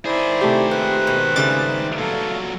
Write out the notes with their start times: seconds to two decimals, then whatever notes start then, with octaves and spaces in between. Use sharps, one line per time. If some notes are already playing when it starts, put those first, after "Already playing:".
0.06 D#3 E4 G#4 C5 D5
0.41 C3 A3 F4 G4
0.71 A#2 B4 C5 F#6
1.07 B2
1.36 C#3 G3 A3 D6 A6
1.98 A#2 F#3 A4 F5